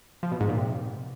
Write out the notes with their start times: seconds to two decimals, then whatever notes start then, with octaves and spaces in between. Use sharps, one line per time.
0.23 F3
0.32 B2
0.40 G#2
0.49 A#2
0.58 C3